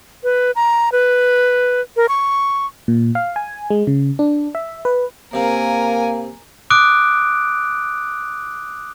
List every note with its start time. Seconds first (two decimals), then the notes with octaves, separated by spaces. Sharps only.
0.24 B4
0.56 A#5
0.92 B4
1.96 A#4
2.09 C#6
2.88 A#2
3.15 F5
3.36 G#5
3.70 G#3
3.87 C#3
4.19 D4
4.55 E5
4.85 B4
5.33 C3 A#3 C4 A#4 F5 G#5
6.70 D6 D#6 F#6 D7